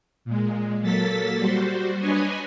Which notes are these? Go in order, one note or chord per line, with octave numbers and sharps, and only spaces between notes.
A#2 G#3
F#3 A#3 A4 A6 B6
G3 F#4 C5
D4 B4 C#5 D#5 G#5